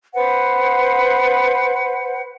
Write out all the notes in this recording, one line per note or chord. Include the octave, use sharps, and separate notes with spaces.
B4 C5 F#5